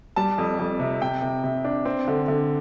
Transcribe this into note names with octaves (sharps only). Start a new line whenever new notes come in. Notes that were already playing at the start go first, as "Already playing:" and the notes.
G3 A5
F2
F2
C3
C3 G5
C3
C3
D4
C4
D3
D3